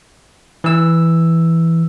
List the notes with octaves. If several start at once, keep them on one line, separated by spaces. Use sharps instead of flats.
E3 E6